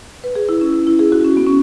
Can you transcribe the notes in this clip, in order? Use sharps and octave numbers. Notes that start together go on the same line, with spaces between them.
B4
G#4
E4
C#4
C#4
E4
G#4
F#4
C#4
B3
C#4